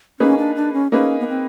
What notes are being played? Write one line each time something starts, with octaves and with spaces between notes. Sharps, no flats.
A#3 C#4 D#4 G#4 B4
D4
D4
C#4
A#3 C#4 D#4 G#4 B4
B3
C4